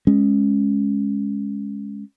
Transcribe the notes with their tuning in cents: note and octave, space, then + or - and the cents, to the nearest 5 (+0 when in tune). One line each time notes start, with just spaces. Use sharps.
G#3 +0 C#4 +0